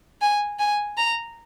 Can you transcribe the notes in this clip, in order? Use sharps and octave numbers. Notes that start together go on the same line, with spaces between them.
G#5
G#5
A#5